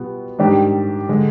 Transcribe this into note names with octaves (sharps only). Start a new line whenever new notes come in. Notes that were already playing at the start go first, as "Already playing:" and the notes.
Already playing: B2 G3 B3 F4
G#2 D#3 G3 D4 G4
D3 G#3